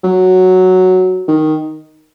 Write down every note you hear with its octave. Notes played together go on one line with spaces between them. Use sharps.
F#3
D#3